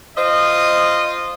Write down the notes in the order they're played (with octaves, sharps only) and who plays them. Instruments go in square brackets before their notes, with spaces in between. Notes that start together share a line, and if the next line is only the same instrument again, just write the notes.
[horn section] F4 C5 D#5